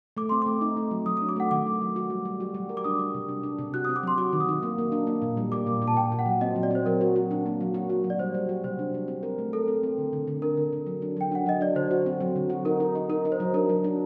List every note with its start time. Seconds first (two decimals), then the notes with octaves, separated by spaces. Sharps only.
0.17 A3 D6
0.29 C4 C6
0.42 A3 D6
0.61 D#4
0.77 A3
0.91 F#3
1.06 F#3 D#6
1.17 D4 D#6
1.29 D6
1.36 A3 F#5
1.51 D#3 D6
1.66 A3
1.81 F#3
1.96 F#4
2.10 G3
2.25 G3
2.40 F#4
2.54 G3
2.69 A#4
2.77 D6
2.84 D4 D#6
2.99 G3
3.14 C3
3.29 D4
3.43 D4
3.58 C3
3.74 F#4 F#6
3.85 C4 D#6
3.96 D6
4.03 F#3 C6
4.18 F#4 D6
4.33 D#3
4.40 D#6
4.49 D#3
4.63 A#3
4.78 A#3
4.92 D4
5.07 A#3
5.22 A#2
5.37 G3
5.52 A#3 D6
5.67 A#2
5.82 A#2
5.88 A5
5.96 A#2 G5
6.12 A#2
6.19 F#5
6.26 F#3
6.41 C4 D#5
6.56 F#3
6.63 D5
6.71 C4 C5
6.86 F#3 A#4
7.01 F#4
7.16 F#4
7.31 D4
7.46 A#3
7.61 F#3
7.74 F#4
7.90 F#4
8.04 F#3
8.10 D5
8.19 G3 C5
8.34 G3
8.49 F#4
8.64 C3 C5
8.79 D4
8.94 G3
9.08 C4
9.23 A#4
9.39 A3
9.53 A4 A#4
9.68 C4
9.83 C4
9.98 D3
10.13 D3
10.27 D3
10.42 D4 A#4
10.57 D3
10.73 D3
10.86 F#3
11.02 D4
11.17 F#3 G5
11.32 D4 F#5
11.46 F#3 D#5
11.61 D4 D5
11.75 D3 C5
11.91 F#4
12.06 C4
12.21 F#3
12.36 D3
12.50 F#4
12.65 D#4 A#4
12.80 D#4
12.95 D#4
13.10 D#4 A#4
13.25 D#4
13.32 C5
13.40 F#3
13.54 D4 A#4
13.69 F#3
13.84 D4